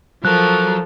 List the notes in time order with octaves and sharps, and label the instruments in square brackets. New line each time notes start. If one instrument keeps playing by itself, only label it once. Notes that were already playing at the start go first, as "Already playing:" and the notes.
[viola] F3 [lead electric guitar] F#3 [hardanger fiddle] A4 A#4 [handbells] F#6